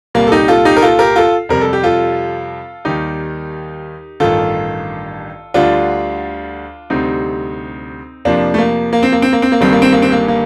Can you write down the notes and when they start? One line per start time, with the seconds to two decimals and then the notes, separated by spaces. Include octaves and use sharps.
0.14 C2 A#2 G3 A#3
0.27 A4
0.32 D#4 G4
0.48 F4 A4
0.65 D#4 G4
0.77 A#4
0.82 F4 A4
0.99 G4 A#4
1.16 F4 A4
1.49 F2 C3 G3 A#4
1.61 A4
1.73 G4
1.83 F4 A4
2.85 D#2 D#3 G3 D#4 G4
4.20 A1 G2 D#3 F4 A4
5.54 D2 D3 G3 D4 F4
6.90 D2 C3 G3 C4 D#4
8.25 F2 C3 F3 A#3 D4
8.54 A3
8.58 A#3
8.93 A#3
9.03 C4
9.12 A#3
9.22 C4
9.33 A#3
9.42 C4
9.52 A#3
9.61 G1 G2 D#3 G3 C4
9.73 A#3
9.82 C4
9.92 A#3
10.02 C4
10.12 A#3
10.28 A#3